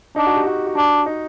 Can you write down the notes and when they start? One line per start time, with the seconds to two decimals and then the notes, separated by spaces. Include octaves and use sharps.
0.16 D4 D#4
0.26 F#4
0.36 G4
0.46 F#4
0.56 G4
0.66 F#4
0.76 D4
1.06 D#4